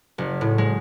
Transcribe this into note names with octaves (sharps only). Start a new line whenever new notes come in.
F#1
A2
G#3